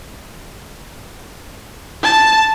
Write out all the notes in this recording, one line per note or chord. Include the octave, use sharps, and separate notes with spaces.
A5